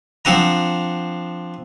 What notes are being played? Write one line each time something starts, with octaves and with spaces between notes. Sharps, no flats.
F3 C4 D4 F#5 A#5